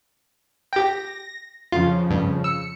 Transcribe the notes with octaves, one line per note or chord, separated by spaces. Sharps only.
G4 G5 A#6
F2 C#3 F3 F4
G2
E6 C#7